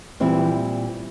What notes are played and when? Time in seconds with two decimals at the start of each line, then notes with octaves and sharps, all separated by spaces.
0.20 A#2 E3 G3 C4 E4